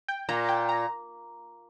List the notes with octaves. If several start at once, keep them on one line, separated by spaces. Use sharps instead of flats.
G5
A#2 A#5
G5
A#5